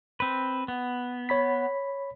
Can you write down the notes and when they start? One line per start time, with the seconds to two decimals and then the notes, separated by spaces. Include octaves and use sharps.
0.20 C4 B4
0.68 B3
1.29 C#5 B5 B6